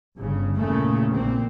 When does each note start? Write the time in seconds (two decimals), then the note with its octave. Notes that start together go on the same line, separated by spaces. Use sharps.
0.18 G1 G2 C#3
0.58 E2 A#2 C#3 A3
1.16 A#1 A#2 A#3 C4